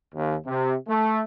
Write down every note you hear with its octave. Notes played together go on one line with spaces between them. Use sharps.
D#2
C3
A3